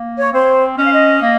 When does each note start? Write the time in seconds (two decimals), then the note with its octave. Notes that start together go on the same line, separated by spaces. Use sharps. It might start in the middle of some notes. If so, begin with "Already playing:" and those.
Already playing: A#3
0.18 C#5
0.33 C4 C5
0.78 C#4 D#5
0.85 F5
0.93 D#5
1.22 A#3